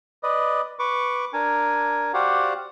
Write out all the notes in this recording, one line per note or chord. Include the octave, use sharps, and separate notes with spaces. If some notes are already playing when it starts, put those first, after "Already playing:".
B4 D5 D#5
B4 C#6 D6
D4 A#4 G#5
F#4 G4 C5 D5 F5 F#5